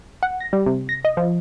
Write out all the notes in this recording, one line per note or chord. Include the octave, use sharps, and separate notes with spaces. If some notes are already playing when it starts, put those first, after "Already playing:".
F#5
A#6
G3
C3
A#6
D#5
F3